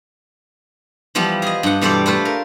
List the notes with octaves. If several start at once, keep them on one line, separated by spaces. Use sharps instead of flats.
E3 F3 G3 B3
G#4 D#5
G2 F#5
B2 E3 G3 A4 C5 D5
A3 F4 B4 C5
A#4